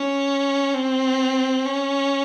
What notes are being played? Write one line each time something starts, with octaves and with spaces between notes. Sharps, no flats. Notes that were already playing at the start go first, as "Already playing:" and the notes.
Already playing: C#4
C4
C#4